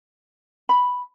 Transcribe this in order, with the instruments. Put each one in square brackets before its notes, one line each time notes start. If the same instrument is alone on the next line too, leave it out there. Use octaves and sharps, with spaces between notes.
[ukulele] B5